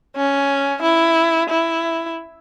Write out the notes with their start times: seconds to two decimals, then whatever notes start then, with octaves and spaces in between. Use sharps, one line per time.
0.16 C#4
0.82 E4
1.49 E4